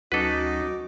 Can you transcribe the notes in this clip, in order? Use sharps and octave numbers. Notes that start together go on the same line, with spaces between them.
D2 F#3 C#4 D#4 F#4 A4 B4 D6